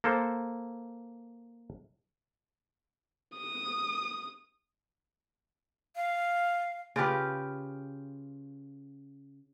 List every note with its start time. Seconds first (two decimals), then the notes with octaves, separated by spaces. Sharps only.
0.04 A#3 A4 C5
3.37 D#6
5.96 F5
6.96 C#3 F4 G4 B4